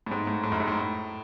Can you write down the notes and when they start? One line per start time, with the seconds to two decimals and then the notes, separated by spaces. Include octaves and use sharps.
0.06 A2
0.11 G#2
0.27 A2
0.43 A2
0.52 F#2
0.60 G#2
0.68 A2